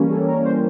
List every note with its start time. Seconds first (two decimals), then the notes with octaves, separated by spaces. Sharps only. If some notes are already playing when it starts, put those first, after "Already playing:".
Already playing: E3 G3 A#3 C#4
0.11 A4
0.28 A#4
0.45 C5